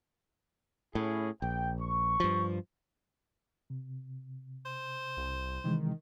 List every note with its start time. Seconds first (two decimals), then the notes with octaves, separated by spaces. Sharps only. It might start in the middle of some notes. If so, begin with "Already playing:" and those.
0.95 A2 C#4 E4 G#4
1.42 A#1 G5
1.81 C#6
2.20 G2 F3
3.70 C3
4.65 C5
5.17 C2
5.64 C3 D#3 E3 G#3